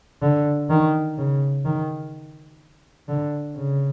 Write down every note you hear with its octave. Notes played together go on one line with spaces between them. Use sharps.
D3
D#3
C#3
D#3
D3
C#3